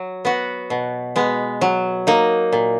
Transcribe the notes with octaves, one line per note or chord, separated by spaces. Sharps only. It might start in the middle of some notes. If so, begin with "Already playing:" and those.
Already playing: F#3
B3 F#4
B2
G#3 B3
F#3
A#3 D#4
A#2